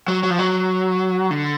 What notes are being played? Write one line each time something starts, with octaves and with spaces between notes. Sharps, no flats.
F#3
F#3
F3
F#3
D3